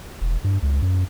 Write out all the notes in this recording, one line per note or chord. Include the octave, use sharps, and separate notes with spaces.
E1
G2
C#2
F#2